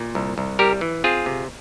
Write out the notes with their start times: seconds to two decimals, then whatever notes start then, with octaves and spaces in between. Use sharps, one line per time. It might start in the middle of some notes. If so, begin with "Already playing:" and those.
Already playing: A#2
0.15 C2
0.38 C2
0.59 G3 G4 A#4
0.81 E3
1.04 C4 F4 G#4
1.26 C3